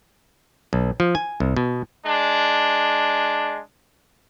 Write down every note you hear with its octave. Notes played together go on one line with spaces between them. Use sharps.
B1
F3
G#5
C2
B2
G#3 D4